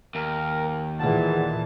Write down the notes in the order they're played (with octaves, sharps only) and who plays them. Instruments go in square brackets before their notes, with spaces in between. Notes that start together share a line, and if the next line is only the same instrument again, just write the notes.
[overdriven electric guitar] D#2 [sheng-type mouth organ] A#4
[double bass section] A#2 E3 [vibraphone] G#4 F#5 [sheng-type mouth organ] A5